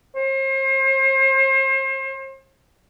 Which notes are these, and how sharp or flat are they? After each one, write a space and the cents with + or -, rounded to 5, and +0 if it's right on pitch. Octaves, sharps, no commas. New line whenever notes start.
C5 +40